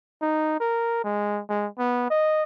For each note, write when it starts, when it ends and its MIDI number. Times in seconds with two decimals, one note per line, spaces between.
0.22 0.59 63
0.60 1.04 70
1.04 1.41 56
1.49 1.68 56
1.78 2.06 59
2.10 2.44 75